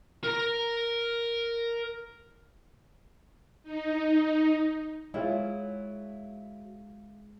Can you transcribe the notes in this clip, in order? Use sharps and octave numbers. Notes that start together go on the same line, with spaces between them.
A#4 A#5
D#4
F#3 G#3 E4 F4 G#4